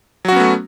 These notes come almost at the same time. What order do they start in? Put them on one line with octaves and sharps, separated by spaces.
F#3 F#4 C#4 B3 A3